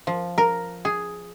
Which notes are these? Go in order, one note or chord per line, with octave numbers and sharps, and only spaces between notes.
F3
A#4
G#4